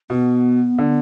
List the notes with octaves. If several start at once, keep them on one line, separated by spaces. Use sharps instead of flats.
B2 B3
D3